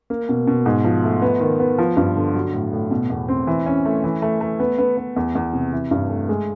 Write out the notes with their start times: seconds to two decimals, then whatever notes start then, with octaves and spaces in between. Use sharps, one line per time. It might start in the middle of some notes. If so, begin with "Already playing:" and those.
0.10 A#3
0.29 B2
0.47 B2
0.66 G#2
0.85 F3
1.04 A3
1.22 B3
1.40 D#3
1.60 B3
1.78 F3
1.97 G2
2.16 D3
2.35 F#3
2.53 A2
2.73 A2
2.91 B2
3.10 E2
3.29 C4
3.47 E3
3.66 C#4
3.85 A3
4.04 E3
4.22 A3
4.41 A3
4.60 B3
4.78 B3
4.97 B3
5.16 E2
5.35 E2
5.53 C3
5.73 E3
5.91 G2
6.09 A3
6.29 G#3